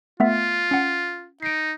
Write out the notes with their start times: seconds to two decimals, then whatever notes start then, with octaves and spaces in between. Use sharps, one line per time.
0.20 A3 B3 F4 E5
0.71 C#4 F#5
1.42 D#4 C7 D7